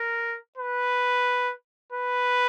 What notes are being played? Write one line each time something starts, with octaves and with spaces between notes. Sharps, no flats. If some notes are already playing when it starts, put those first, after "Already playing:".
Already playing: A#4
B4
B4